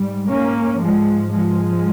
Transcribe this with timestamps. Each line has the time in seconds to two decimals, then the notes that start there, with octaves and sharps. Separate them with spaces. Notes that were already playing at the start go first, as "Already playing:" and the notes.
Already playing: G#2 G3
0.29 A#3 C#4
0.80 G#2 F3 G#3
1.32 F3 G#3